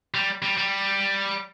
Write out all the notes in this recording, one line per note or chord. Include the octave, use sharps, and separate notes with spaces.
G3
G3
G3